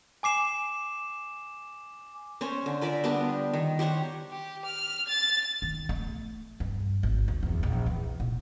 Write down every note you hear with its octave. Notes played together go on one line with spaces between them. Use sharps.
G#5 D6 C7 E7
C#4 C5 C#5
D3
F4 A#4 D5 E5
G3 B3 D4 G4
D#3
G4 C5 C#5 F#5
G4
F6
A6
D#3
A3
G2
G#1
D2
E2
A#1
E3
A#2